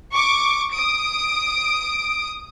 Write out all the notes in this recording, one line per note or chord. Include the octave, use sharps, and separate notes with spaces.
C#6 D6
D#6 D7